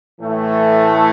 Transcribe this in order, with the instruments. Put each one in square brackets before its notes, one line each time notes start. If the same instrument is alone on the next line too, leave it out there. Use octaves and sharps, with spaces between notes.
[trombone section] A2 E3 A3